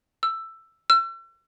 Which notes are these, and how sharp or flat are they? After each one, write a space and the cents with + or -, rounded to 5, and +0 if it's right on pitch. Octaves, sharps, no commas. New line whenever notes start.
E6 +10
E6 +40